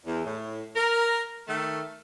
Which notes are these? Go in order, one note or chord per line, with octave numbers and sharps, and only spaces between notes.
E2
A2
A#4
D#3 A3